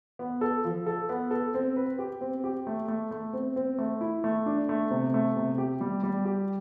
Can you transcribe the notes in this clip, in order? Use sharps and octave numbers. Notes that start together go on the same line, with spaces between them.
B3
A4
F3
A4
B3
A4
C4
B4
G4
C4
G4
A3
A3
A3
C4
C4
A3
E4
A3
D4
A3
C3
A3
C3
G4
G3
G3
G4